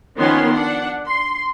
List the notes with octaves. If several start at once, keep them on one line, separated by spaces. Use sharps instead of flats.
D#3 F3 B3 C#4 C#5 C6
D4 F#5
C6